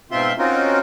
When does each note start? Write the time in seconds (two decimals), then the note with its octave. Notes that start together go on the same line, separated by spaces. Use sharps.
0.11 G#2 B2 C4 F4 E5 C6
0.38 C4 C#4 D#4 F4 F#4 A#4